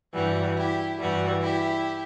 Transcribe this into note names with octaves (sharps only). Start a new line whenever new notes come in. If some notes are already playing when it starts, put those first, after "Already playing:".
G2 E3 G3 F#4
E4 G4
G2 E3 G3 F#4
E4 G4